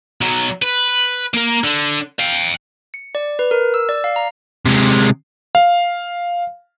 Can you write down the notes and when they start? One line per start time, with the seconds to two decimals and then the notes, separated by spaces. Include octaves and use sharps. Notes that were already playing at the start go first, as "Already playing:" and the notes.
0.21 B1 F#3
0.62 B4
1.34 A#3 A#4
1.64 D3
2.19 F5 G5
2.94 C#7
3.15 D5
3.39 B4
3.51 A#4
3.74 E6
3.89 D5
4.04 F5
4.16 A#5
4.65 C3 G#3
5.55 F5